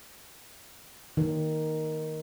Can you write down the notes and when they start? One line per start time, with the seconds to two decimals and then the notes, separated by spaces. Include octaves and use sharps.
1.17 D#3